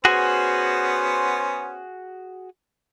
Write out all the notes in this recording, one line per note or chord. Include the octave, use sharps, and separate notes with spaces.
B3 C#4 F#4 G#4 C5